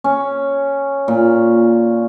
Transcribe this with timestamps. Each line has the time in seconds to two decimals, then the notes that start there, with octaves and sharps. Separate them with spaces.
0.04 C#4
1.08 A#2